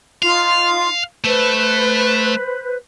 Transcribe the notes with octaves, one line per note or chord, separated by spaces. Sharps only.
D#4 F4 F5 C6
A3 B4 C5